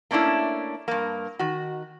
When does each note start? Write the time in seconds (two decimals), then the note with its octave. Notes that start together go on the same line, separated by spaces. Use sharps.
0.11 A3 A#3 C#4 D4 E4
0.88 G2 A#3
1.39 D#3 F#4